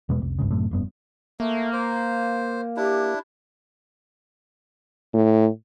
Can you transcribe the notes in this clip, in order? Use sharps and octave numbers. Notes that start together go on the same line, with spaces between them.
E2 B2 G#3 B3
F1 C2
G1 C#2 G#2 C#3
F#1 F#2 A2 C3
F1 G2 B3
A3 A#3
C5
D4 E4 G4
A2